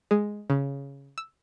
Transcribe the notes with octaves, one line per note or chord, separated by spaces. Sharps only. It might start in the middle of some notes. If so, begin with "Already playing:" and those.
G#3
C#3
E6